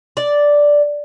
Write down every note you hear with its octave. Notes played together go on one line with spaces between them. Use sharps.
D5